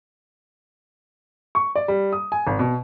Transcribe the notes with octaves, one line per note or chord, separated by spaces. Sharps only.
C#6
D5
G3
D#6
G#5
G#1
B2